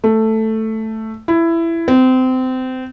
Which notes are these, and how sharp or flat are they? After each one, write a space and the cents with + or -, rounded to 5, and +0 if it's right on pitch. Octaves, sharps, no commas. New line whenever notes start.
A3 +5
E4 +15
C4 -25